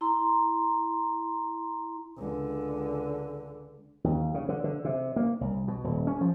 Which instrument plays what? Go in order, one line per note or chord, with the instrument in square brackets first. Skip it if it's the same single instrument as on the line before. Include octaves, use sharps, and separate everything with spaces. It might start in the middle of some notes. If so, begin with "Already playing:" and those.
[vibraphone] E4 A#5 C6
[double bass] C#2 D3
[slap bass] D#2
C#3
D3
D3
C3
A#3
C2
B2
D#1
C#4
F3